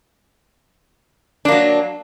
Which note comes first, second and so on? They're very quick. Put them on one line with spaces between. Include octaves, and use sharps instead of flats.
D4 A#3 F#3